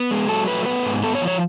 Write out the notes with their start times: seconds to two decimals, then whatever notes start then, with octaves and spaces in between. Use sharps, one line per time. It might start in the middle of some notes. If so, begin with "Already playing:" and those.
Already playing: B3
0.11 G#3
0.29 F#3 A4
0.48 A3 B4
0.66 B3 B4
0.85 G#2
1.03 B3 A4
1.15 C#5
1.21 F3
1.27 C#5